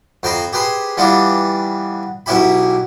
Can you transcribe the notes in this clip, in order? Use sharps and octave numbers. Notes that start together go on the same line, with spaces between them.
F2 C5 G5 A#5 B5 D#6
G4 G#4 B4 C5
E3 G3 B3 D4 F4 G4
B1 B2 C#4 E4 G4 B5